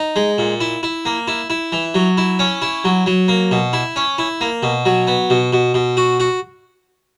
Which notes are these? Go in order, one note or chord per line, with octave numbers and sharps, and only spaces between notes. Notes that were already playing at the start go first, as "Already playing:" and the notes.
Already playing: D#4
G#3
A#2
E4
E4
A#3
E4
E4
E3
F#3
E4
C#4
E4
F#3
F#3
A#3
B2
E4
C#4
E4
A#3
B2
F#3
B3
B2
B2
B2
F#4
F#4